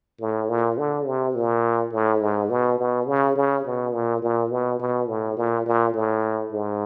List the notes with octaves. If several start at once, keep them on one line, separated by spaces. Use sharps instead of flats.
A2
A#2
D3
C3
A#2
A2
G#2
B2
B2
C#3
C#3
B2
A#2
A#2
B2
B2
A2
A#2
A#2
A2
G#2